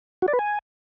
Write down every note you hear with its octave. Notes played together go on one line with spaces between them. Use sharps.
F#4
D5
B4
G#5